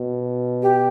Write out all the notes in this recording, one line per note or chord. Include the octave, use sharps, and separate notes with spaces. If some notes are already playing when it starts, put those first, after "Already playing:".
Already playing: B2
G4